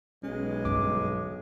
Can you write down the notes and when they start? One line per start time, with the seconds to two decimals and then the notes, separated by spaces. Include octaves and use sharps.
0.23 B1 G#3 C#4
0.65 G2 D3 D6